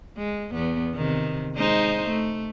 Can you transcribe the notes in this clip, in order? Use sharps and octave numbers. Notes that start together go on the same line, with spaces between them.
G#3
E2 B3
C3 D#3
G#3 D#4 C5
A3